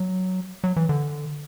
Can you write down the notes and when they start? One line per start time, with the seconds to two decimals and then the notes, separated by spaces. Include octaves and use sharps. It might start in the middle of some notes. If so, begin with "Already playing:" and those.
Already playing: F#3
0.64 F#3
0.76 E3
0.89 D3